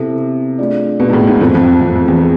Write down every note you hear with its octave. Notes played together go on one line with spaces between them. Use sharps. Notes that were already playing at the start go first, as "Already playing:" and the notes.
Already playing: C3 B3 E4 A4 C5 E5
A3 D4 F4 G#4 D5
B2
G#2
A2
G#2
F2 F4 A4 C5
F2
F2
F2
E2
G#4